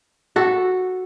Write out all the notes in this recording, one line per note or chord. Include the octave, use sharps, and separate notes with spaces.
F#4 A4